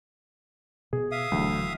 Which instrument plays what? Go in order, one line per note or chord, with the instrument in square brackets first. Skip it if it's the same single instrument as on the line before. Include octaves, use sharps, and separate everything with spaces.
[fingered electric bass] B2 [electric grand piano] G#4
[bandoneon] E5 F5 D#6
[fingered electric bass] D1 E3 F#3 [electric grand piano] D2